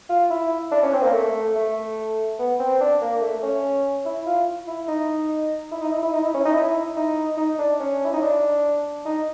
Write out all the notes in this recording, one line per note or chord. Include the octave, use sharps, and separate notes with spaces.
F4
E4
D4
C#4
C4
A#3
A3
A3
B3
C4
D4
A#3
A3
C#4
E4
F4
E4
D#4
E4
D#4
E4
E4
D#4
E4
C#4
D#4
E4
D#4
D#4
D4
C#4
E4
D#4
D4
D#4